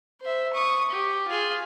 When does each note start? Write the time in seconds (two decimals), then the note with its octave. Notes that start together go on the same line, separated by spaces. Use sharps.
0.22 C5 E5
0.54 C#6 D#6
0.91 G4
1.28 F4 G#4